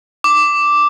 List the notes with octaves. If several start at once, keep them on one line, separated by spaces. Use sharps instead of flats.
D6